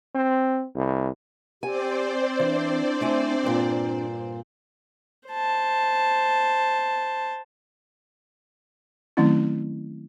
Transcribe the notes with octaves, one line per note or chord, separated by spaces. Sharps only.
C4
C2
C4 G4 C5 D5 G#5
E3 D4
A3 E4 G#5
G2 A#2
C5 A5
D#3 F#3 A3 C4 C#4 E4